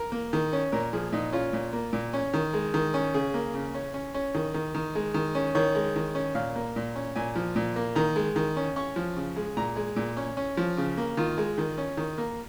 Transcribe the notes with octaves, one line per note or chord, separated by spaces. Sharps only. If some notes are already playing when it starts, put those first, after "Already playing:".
Already playing: A#4
A#3
D#3
C#4
A#2 A#4
F3 G#4
A#2 D#4
C#4 F4
A#2
A#3
A#2
C#4
D#3
G#3
D#3
C#4
C#3 G#4
A#3
C#3
C#4
C#4
C#4
D#3
D#3
D#3
G#3
D#3
C#4
D#3 C#5
G#3
D#3
C#4
A#2 F5
A#3
A#2
C#4
A#2 G#5
F3
A#2
A#3
D#3 A#5
G#3
D#3
C#4
C#4 C#6
F3
C#3
G#3
A#2 A#5
G#3
A#2
C#4
C#4
F3
C#3
A#3
D#3 F4
G#3
D#3
C#4
D#3
A#3